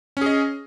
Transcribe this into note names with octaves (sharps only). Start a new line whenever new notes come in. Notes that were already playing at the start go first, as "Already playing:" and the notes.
C#4 G#4 D#5